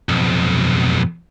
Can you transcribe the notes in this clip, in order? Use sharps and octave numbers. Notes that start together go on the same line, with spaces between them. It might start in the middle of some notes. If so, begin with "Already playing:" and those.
B1 F2